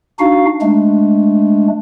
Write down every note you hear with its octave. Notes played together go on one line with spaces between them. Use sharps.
D4 D#4 F#4 F5
G#3 A3 D4